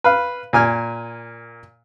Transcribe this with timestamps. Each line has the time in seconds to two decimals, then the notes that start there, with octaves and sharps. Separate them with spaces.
0.04 B4 F5
0.53 A#2 G#5 F6